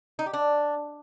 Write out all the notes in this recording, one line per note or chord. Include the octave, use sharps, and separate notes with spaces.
D#4
G4
D4